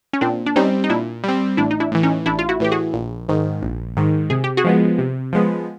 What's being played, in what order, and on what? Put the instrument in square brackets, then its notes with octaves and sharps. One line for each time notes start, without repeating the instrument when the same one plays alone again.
[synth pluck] C#4
[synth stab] A#2 [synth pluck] C4 D4
[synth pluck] D4
[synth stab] G3 C4 [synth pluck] C#4 D#4
[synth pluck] D#4
[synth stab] A#2 [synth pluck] D4 E4
[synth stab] G3 C4
[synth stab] A1 [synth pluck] D4 E4
[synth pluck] D#4
D4 E4
[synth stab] A2 E3
[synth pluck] C#4 D#4
[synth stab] A1 [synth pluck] D4 E4
[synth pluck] F4
E4 F#4
[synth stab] A2 E3 [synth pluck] G4
[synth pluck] F#4 G#4
[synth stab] A#1
G#2 D#3
A#1
G#2 D#3
[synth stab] C3 [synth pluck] G#4
[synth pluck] G4
F#4 G#4
[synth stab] F3 G#3 B3
C3
F3 G#3 B3